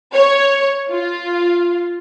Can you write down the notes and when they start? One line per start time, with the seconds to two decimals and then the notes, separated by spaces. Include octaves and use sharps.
0.14 C#5
0.89 F4